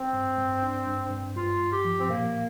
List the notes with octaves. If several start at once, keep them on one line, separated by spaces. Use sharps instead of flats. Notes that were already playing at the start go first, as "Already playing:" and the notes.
Already playing: C4
G2
G2
D4
G2
G2
G2 F4
G2
G4
F3
C4
A#2 A#3